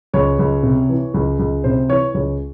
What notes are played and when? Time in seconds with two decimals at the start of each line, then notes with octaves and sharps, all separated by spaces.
0.13 C#2 C#5
0.39 C#2
0.63 C3
0.89 E3
1.14 C#2
1.39 C#2
1.64 C3 C5
1.89 E3 C#5
2.14 C#2 C#5